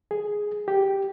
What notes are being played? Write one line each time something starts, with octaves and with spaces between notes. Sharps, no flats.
G#4
G4